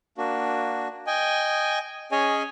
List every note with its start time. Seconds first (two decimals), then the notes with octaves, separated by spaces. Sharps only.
0.18 A#3 D4 F#4
1.07 D#5 G5 G#5
2.12 C#4 G#4 C#5 D#5 G#5